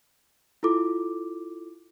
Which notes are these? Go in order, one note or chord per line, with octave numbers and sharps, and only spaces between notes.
E4 F4 A4 D6